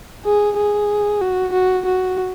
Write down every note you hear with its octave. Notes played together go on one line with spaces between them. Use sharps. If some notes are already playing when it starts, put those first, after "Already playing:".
G#4
G#4
F#4
F#4
F#4